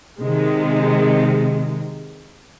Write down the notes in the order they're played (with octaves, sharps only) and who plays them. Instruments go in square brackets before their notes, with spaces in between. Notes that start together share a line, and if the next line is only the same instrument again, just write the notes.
[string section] C3 D#3 G#3